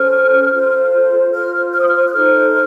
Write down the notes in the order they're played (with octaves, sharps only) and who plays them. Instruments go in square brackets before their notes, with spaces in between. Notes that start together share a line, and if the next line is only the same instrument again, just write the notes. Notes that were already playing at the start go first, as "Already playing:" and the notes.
Already playing: [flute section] C#4 A4 C5 F6
F4 A4 C5
F4 C5 F6
F6
D#6
F6
F#6
D#4 A4 C5 F6